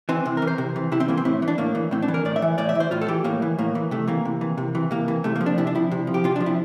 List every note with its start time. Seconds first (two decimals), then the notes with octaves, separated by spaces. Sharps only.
0.09 E3 C4
0.26 C3
0.37 A#4
0.42 E3
0.47 C5
0.58 C3
0.76 E3
0.92 C3 E4
1.00 C4
1.08 E3 A#3
1.17 C4
1.25 A2 E4
1.42 E3
1.48 D4
1.58 A2 A#3
1.75 E3
1.91 A2 C4
2.02 D4
2.08 E3
2.14 A#4
2.25 A2 D5
2.36 E5
2.42 E3
2.58 A2 D5
2.69 E5
2.75 E3
2.80 C5
2.91 A2 F4
3.01 A4
3.08 E3 G4
3.24 A2 A#3
3.42 E3
3.58 A2 A#3
3.75 E3
3.91 C3 A3
4.08 E3 A#3
4.25 C3
4.41 E3
4.58 C3
4.75 E3
4.91 C3 A#3
5.08 E3
5.24 C3 A3
5.36 A#3
5.41 F3
5.46 D4
5.58 C3 E4
5.67 D4
5.75 F3 E4
5.91 C3
6.07 F3
6.14 G4
6.24 C3 F4
6.36 D4
6.40 F3
6.46 E4